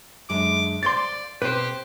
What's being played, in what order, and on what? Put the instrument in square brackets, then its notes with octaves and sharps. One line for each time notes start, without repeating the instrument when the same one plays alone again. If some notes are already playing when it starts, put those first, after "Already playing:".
[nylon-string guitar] F#2 D3 G#3 [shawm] D6
[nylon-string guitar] C5 F5 [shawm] D5 [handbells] C6 A6
[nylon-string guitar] B2 C4 [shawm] G4 [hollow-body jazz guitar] B4 C5